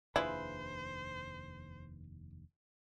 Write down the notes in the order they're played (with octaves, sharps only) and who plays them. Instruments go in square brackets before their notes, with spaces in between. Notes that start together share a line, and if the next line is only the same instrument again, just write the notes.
[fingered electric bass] F1 D#2 D4 [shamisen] E4 [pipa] F4 G#4 B4 [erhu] C5